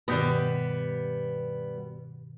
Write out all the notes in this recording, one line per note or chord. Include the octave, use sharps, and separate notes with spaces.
G2 B2 D#3 G3 B3